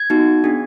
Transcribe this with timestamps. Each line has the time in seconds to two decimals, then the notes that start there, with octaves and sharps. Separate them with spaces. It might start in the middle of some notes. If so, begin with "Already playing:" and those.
Already playing: G#6
0.10 B3 D#4 F#4
0.44 B3 D4 G#4